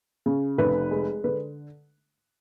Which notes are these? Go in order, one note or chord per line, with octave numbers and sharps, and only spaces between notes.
C#3
F1 B4
G#3
D3 B4